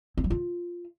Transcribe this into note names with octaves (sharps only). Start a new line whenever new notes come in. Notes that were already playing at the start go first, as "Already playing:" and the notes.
C4
F#3
F4